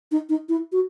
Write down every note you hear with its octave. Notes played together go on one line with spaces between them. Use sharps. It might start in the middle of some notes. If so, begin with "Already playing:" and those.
D#4
D#4
E4
F#4